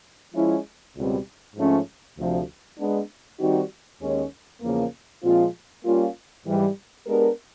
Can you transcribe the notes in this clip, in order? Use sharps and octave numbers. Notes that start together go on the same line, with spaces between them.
F3 G#3 C#4 E4
C#2 B2 G3 C4
G#2 F3 A3 C#4
D2 C3 F3
G#3 B3 D4
D#3 G3 C4 D#4 F#4
D#2 D#3 G#3 C#4
E2 C#3 F3 A#3
A#2 F3 G#3 C4 F4
G3 A#3 C#4 F4
G#2 E3 G3
G#3 B3 D4 G4 A#4